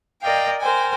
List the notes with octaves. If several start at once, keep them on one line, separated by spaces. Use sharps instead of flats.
A#4 D5 D#5 F5 G5
A#4 C5 G5 G#5